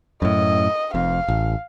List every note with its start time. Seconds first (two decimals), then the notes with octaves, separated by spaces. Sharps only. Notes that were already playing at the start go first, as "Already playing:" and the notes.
0.22 F#2 A2 D#5
0.94 F1 F2 F5
1.28 A1